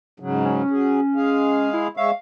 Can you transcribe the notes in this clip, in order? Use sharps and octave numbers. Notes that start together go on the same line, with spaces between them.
G#2 C#3 F#3
C#4
F#3 G#4
G#3 G#4 F5
E4
G#3 C#5 E5 F5